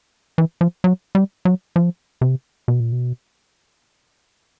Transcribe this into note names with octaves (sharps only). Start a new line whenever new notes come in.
E3
F3
F#3
G3
F#3
F3
C3
B2
A#2
B2